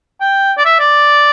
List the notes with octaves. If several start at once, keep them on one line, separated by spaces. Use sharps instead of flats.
G5
D5
E5
D5